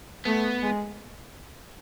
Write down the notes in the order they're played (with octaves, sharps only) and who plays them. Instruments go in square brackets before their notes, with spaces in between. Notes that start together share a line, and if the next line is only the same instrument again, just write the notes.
[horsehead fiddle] A3 [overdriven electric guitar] B3
[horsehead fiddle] G#3